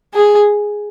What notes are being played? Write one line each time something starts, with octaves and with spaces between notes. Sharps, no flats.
G#4